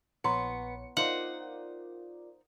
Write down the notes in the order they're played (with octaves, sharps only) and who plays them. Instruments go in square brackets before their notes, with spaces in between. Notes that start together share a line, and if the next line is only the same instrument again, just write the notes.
[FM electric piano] A#1 C#5 C#7 [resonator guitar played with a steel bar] B3 [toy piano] E4 A#5 C6
[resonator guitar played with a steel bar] D#4 C5 [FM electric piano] F4 A#4 D5 [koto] F#5